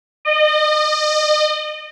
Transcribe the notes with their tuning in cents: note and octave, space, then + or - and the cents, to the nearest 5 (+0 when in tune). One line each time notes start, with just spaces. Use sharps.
D#5 -35